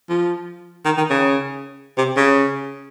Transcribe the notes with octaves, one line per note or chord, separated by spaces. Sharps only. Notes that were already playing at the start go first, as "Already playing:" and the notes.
F3
D#3
D#3
C#3
C3
C#3